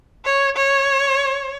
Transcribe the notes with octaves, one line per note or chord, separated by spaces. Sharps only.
C#5
C#5